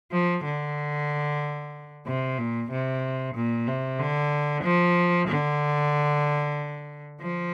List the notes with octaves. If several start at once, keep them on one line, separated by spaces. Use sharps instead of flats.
F3
D3
C3
A#2
C3
A#2
C3
D3
F3
D3
F3